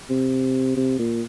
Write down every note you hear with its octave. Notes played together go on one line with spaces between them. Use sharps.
C3
C3
A#2